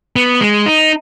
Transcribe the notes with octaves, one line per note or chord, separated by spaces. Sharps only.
B3
G#3
D#4